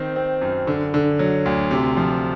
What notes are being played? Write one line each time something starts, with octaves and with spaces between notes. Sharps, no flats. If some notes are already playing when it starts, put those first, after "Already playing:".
Already playing: D#3 C4
C4
F#2
D3
D3
F#3
D2
C3
F3